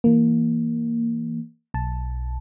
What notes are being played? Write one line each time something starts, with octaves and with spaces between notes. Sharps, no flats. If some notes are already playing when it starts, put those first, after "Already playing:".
E3 A#3
B1 A5